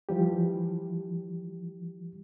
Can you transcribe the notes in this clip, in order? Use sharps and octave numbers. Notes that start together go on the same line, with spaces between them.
E3 F3 G3 G4